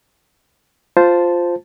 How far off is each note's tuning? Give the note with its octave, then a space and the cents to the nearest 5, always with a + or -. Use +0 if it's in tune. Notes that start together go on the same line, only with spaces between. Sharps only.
F4 +0 C5 -5 A5 +0